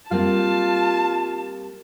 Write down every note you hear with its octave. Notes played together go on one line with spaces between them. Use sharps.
G3 A#3 C4 F4 A5